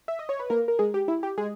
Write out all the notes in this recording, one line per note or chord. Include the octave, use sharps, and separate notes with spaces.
E5
D#5
C#5
B4
A#3 A#4
A#4
G#3 G#4
G4
E4
G4
G#3 G#4